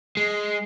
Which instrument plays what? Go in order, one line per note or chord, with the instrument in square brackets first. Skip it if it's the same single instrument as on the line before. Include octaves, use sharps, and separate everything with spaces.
[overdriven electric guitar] G#3